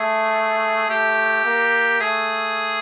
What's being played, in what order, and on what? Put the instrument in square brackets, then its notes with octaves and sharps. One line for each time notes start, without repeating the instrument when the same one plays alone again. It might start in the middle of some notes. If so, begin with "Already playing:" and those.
Already playing: [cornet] A3 [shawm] G#4
[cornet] A3 [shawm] G4
[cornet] A#3
[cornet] A3 [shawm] G#4